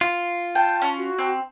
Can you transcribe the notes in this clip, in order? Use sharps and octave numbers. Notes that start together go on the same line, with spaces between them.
F4
G5 A5
C#4
F#4
C4